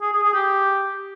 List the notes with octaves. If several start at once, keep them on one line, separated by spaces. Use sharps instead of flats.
G#4
G#4
G#4
G4